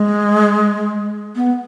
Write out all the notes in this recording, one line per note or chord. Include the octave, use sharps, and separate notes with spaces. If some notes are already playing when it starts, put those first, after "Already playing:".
Already playing: G#3
B3